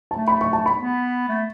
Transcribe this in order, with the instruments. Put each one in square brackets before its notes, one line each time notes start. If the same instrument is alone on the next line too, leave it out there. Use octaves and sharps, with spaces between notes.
[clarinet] A3 [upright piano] A5
[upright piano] B5
C#6
A5
B5
[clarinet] B3
A3